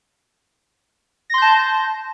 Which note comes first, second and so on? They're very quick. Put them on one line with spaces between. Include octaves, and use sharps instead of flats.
A#6 C6 G6 A5